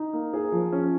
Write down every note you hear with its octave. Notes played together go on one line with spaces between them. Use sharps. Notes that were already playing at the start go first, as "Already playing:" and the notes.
Already playing: D#4
A#3
G#4
F3
C#4